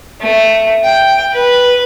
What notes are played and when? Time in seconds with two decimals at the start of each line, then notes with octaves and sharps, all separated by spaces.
0.22 A3
0.85 G5
1.34 B4